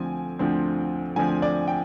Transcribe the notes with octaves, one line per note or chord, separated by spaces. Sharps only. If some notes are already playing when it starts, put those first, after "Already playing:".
Already playing: D2 D3 F3 C4 G#5
D2 D3 F3 C4
D2 D3 F3 C4 G#5
D5
G5